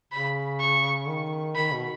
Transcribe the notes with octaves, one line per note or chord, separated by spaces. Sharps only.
C#3 B5
C#6
D#3
D#3 B5
B2